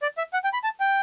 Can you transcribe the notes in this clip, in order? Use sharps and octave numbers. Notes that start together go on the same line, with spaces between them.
D5
E5
F#5
G5
B5
A5
G5